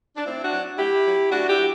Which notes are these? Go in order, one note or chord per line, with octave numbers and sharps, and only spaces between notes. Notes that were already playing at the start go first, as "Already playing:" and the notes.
D4
A2 C4 E4
D4 F#4
F#3
A2 E4 G4
F#3
A2 D4 F#4
E4 G4
F#3